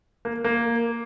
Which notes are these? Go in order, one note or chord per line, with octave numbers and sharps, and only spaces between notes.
A#3
A#3